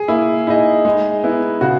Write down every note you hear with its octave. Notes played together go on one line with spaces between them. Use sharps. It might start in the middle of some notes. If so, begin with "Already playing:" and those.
Already playing: G#4
A#3 E4
D#4 E4 G#4 D#5
G#3 D#4
B3 E4
C#3 F#4